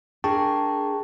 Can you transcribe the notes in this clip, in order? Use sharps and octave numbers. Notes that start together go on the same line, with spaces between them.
D4 G#4 A#4 G5 A5 C#6